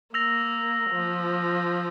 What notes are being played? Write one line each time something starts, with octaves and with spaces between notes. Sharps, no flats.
A#3 E6 A#6 F7
F3